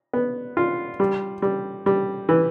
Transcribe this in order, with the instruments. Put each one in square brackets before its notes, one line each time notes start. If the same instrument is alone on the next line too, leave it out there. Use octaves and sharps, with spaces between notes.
[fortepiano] B3
F4
G3
G3
G3
E3